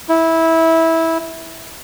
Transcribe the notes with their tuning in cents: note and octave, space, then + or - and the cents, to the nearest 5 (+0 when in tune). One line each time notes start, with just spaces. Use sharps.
E4 -15